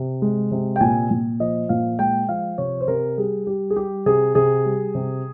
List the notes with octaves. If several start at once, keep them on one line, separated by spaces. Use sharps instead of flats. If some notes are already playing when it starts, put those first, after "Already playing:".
Already playing: C3
G#3
C3
G5
A#2 G#5
A#2
F3 D#5
A#2 F5
G#3 G5
F3 F5
C3 C#5
C5
C3 A#4
G3 G#4
G3 G4
G#4
G3 G4
C3 G#4
C3 G#4
G3
C3